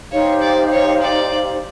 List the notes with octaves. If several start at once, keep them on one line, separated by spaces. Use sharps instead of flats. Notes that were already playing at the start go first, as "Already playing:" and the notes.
D#4 G4 C5 C#5 F5
D5
C#5
D5